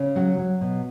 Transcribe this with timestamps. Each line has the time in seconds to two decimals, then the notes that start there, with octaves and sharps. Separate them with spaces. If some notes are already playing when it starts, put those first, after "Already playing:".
Already playing: C#3
0.15 F#3 F#4
0.38 F#3
0.61 B2